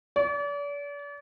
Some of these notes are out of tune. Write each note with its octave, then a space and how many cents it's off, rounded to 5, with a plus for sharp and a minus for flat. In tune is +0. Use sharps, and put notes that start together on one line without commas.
D5 -40